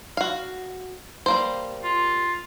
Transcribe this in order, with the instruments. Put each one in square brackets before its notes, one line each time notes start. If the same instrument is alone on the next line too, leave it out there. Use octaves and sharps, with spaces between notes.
[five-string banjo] F#4 F5
G3 A#3 C5
[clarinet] F4